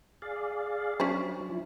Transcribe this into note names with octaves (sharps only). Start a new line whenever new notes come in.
G#4 D5 F5
F#3 C#4 D4 C5
F3 E4